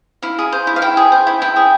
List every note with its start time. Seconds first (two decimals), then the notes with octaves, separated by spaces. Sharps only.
0.22 E4 F5
0.38 G#4
0.52 C5
0.67 E4
0.76 F5
0.82 E4 G5
0.97 G#4
1.12 C5
1.27 E4
1.42 E4 G5
1.56 G#4